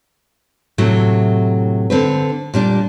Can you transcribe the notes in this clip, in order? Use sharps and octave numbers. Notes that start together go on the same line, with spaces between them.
A2 C3 F#3 A3 E4
D3 C4 B4
A#2 G3 D4